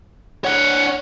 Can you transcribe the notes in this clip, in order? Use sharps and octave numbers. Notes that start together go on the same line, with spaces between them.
D4 C#5 F#5